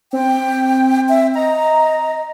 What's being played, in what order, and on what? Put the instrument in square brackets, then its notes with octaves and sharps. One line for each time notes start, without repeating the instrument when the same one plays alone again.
[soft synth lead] C4 [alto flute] G5
[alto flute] E5
[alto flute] D#5 [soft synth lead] A#5